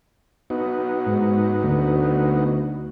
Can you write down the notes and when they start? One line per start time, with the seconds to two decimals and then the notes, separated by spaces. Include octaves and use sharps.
0.50 B3 D#4 F#4
1.06 G#2
1.64 D2